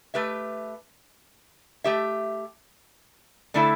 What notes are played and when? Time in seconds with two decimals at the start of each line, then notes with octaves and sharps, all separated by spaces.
0.14 A3 G4 B4 E5
1.84 A3 G4 E5
3.54 D3 A3 E4 A4 E5